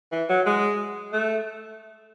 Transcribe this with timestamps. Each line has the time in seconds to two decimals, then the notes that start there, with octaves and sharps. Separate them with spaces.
0.12 E3
0.29 F#3
0.46 G#3
1.13 A3